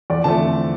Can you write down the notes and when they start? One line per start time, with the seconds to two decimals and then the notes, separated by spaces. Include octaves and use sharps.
0.10 E2 D5
0.24 D3 F3 A3 C4 A5